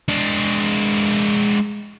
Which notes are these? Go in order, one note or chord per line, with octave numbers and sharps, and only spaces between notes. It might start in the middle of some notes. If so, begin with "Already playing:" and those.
G#3 D4